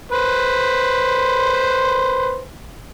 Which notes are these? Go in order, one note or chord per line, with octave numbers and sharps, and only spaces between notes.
B4 C5